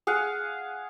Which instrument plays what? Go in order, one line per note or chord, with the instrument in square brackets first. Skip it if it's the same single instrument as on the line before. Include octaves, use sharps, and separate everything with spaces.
[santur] G#4 F5 F#5